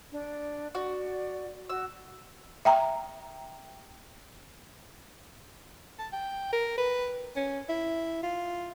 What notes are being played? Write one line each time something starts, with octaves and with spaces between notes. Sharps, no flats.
D4
F#4 D5
F#4 E6
E5 G5 A#5
A5
G5
A#4
B4
C#4
E4
F4